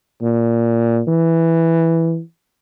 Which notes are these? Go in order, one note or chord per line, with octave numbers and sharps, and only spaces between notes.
A#2
E3